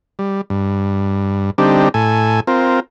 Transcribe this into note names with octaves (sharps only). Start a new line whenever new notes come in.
G3
G2
D3 G3 C4 D4 D#4 G4
A2 A4 G#5
C4 F4 A#4